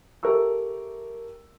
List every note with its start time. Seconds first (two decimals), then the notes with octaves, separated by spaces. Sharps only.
0.23 G4 A4 A#4 E5 C#6 E6